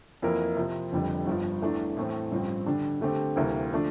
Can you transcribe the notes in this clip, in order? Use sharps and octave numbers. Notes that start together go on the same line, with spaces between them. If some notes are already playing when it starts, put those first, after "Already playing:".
F2 E3 A#3 E4 A#4
C3 F3 C4
F1 F2 D3 G3
G1 G2 F3
E2 E3 A3 D4
A2 E3 A3 C4
A1 G2 F3 C4
D3 G3 D4
D3 A3 C4 G4
D2 C3 E3 G3 A#3
D3 F3 A3 D4